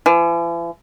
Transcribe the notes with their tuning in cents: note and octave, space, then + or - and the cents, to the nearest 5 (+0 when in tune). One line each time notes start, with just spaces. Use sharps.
E3 +45